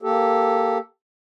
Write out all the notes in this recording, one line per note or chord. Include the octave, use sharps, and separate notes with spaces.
A#3 G4 A4